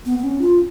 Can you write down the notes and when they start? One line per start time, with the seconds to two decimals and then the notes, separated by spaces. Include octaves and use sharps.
0.06 B3
0.18 B3
0.24 C#4
0.41 F4